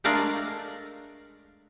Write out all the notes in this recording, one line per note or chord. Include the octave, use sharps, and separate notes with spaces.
G#3 A3 D4 A#4 D5 F5